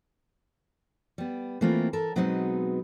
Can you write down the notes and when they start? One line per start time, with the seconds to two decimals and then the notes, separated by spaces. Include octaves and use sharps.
1.18 G3 B3
1.61 E3 A3 A#3 C4 E4 F4
1.93 A4 A#4 A5
2.16 B2 F#3 G#3 B3 C4 D#4